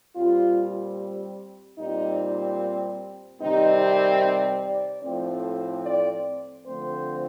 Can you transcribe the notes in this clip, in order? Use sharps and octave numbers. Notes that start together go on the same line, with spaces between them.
A#2 G3 C4 F4
A#2 G3 C4 D#4
C3 D#3 G3 C4 D#4
C5
D5
A2 F3 A3 C4
D5
D3 F3 A3 C4 C5